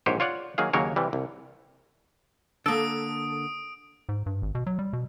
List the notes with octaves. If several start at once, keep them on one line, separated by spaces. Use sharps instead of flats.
A#1 G#2 G4 C5 C#5 G#5
F4 C#5 D5 F#5
D#3 F#3 A#3 G#4 F5
D#2 C#3 F#3 A#3 A#4 C#5
C3 E3 G3
C2
D3 A#3 A4 D#6 D7
G#2
G2
G#1
B2
F#3
G3
B2